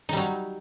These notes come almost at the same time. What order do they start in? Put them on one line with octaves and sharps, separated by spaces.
D#4 G3 F#3